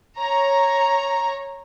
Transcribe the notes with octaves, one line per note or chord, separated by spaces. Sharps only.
C#5 A#5